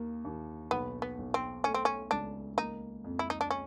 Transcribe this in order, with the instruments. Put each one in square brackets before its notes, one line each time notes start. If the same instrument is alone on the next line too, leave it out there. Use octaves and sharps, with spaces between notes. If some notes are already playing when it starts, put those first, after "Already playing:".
Already playing: [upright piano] D#2 A#3
D#2
[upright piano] B1 [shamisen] B3
[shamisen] B3
[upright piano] B1
[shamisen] C4
[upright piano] A3 [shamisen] C#4
[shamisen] C4
C#4
[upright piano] C#2 [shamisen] D4
[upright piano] A#3 [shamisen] D#4
[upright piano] F2
[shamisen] E4
D#4
D4
C#4